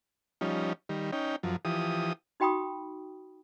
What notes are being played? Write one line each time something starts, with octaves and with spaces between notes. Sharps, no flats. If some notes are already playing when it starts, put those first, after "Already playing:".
F3 G3 C#4 D#4
D#3 G3
C#4 D#4 G5
F#2 F3
E3 F3 G4 D#6
D#4 F#4 G5 B5 C#6 D#6